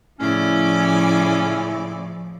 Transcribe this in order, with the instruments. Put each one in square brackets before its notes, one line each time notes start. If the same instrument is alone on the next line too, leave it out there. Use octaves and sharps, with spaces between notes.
[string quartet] A2 C#3 D5 [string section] F3 [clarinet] C#4 [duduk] E4